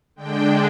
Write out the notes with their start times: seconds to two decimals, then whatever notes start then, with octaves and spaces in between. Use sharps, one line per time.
0.16 D3 G#3 D4 G5